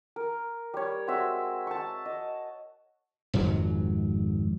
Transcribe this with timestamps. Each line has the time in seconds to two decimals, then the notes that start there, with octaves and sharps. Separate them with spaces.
0.16 A#4
0.74 G3 C#5
1.07 G#3 C4 F#4 E5
1.67 A5 C#6
2.06 D#5
3.34 G#1 F2 G#2 F#3